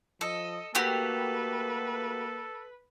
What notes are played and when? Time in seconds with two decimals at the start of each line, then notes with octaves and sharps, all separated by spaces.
0.21 F3 A4 D#5
0.75 A3 A#3 F#4 G4 A4 B4